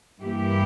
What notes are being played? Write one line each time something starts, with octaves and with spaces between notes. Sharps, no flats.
G2 E3 A#3 E4 G4